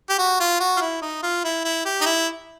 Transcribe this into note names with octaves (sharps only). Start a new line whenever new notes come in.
G4
F#4
F4
F#4
F4
E4
D#4
F4
E4
E4
G4
D#4
E4